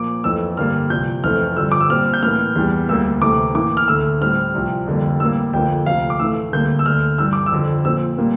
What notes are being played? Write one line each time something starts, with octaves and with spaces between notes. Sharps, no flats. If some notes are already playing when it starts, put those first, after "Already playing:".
Already playing: A#2 F3 A#3 D6
F2 E3 A3 E6
G2 D3 G3 A#3 F6
C2 C3 F3 G6
F2 E3 A3 C4 F6
G2 D3 F3 E6
D6
E6
A#2 G3 C4 F6
G6
A2 E3 A#3 F6
E2 E3 G3
D2 D3 G3 A#3 E6
D2 C3 E3 A3 D6
A2 E3 A#3 D6
F6
D2 D3 A3 E6
A2 G3 C4 F6
C2 C3 F3
F2 D3 G3 A#3
A2 G3 A#3 E6
F2 D3 F3 A#3 G5
D2 C3 F3 F5
D6
A2 E3 A3 E6
D2 D3 G3 A#3 G6
E6
D2 D3 A3 F6
G2 E3 G3 E6
D6
E6
F2 D3 F3
A#2 F3 C4 E6
A#2 G3 A#3